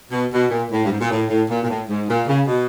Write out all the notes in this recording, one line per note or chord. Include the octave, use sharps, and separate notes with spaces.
B2
B2
A#2
A2
G2
G#2
A#2
A2
A2
A#2
A#2
A2
G#2
A#2
C#3
B2